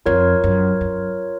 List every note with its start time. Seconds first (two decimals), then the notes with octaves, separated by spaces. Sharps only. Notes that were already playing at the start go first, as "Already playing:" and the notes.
0.06 F2 F4 A#4 C#5
0.44 F#2
0.81 F#2